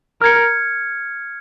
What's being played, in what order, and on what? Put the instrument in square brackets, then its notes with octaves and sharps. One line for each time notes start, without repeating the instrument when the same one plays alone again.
[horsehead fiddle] A#4 [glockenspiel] F6 G#6 C#7